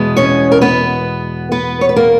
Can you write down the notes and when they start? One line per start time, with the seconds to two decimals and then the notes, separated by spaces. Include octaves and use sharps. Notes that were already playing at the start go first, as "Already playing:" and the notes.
Already playing: E2 B2 G#3 B3
0.16 C#4 C#5
0.52 A#4
0.61 B3 B4
1.52 B3 B4
1.81 C#5
1.89 B4
1.96 A#3 A#4